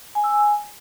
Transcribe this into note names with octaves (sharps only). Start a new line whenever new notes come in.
G#5
E6
G#5